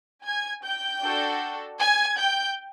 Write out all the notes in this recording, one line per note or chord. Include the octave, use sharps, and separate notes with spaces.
G#5 G#6
G5 G6
D4 F#4 A4
G#5 G#6
G5 G6